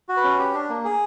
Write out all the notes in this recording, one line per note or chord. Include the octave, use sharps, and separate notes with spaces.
F#4
B4
C#4
G4
D4
A#3
G#4